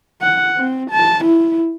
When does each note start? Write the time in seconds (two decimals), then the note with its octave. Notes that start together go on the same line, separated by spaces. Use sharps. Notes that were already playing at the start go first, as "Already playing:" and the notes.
0.21 F#5
0.57 C4
0.91 A5
1.25 E4